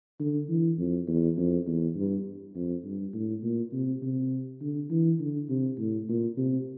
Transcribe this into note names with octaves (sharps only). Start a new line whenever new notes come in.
D3
E3
F2
E2
F2
E2
G2
F2
G2
A2
A#2
C3
C3
D3
E3
D3
C3
A2
A#2
C3